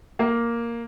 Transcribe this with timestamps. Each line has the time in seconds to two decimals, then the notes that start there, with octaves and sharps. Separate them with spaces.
0.19 A#3